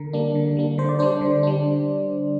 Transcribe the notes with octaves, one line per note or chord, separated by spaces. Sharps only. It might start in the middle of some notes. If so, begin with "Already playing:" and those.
Already playing: D3 A#4
G3 A#3 D4
D3
G3 A#3 D4
D3 C5
D5
G3 D4 C5
D3
G3 D4